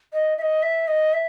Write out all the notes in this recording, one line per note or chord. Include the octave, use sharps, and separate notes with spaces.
D#5
E5
D#5
E5
D#5
E5